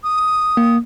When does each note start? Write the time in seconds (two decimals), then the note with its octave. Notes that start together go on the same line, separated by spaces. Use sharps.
0.04 D#6
0.57 A#3